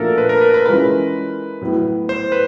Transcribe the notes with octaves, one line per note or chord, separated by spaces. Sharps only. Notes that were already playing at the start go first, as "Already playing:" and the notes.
Already playing: A#2 F3 A3 D4 F#4 A4 A#4
B4
A#4
B4
B4
E3 G#3 C#4 F4 A#4 B4
A2 F#3 B3
C5
B4